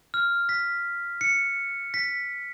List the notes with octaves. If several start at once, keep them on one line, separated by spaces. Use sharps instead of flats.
F6
B6
C#7
B6